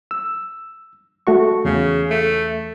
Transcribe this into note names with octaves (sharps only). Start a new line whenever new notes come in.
E6
A3 F#4 C#6
E2 C#3
A3